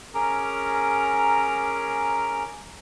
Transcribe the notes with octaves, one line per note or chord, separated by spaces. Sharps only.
C#4 G#4 A#4 A#5 D6